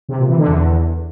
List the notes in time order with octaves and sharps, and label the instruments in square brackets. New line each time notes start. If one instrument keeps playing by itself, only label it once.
[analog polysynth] C3
A#2
E3
D3
E2